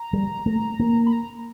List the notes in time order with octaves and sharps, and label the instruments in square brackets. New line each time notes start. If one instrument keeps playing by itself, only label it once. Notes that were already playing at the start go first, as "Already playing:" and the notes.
Already playing: [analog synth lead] A#5
[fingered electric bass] G3
A3
A#3
[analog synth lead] B5
A#5